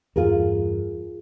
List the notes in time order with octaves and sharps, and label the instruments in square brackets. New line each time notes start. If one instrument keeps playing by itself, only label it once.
[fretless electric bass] E2 G2 [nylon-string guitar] F4 G#4 A#4